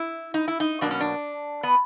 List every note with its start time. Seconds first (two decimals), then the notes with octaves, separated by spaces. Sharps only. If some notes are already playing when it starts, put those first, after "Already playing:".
Already playing: E4
0.34 D#4
0.48 E4
0.60 D#4
0.81 B2 F#3 A#3 D4
0.91 C#4
1.01 D4
1.63 B3